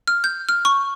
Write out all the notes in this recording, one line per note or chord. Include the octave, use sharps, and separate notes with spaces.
F6
G6
F6
C#6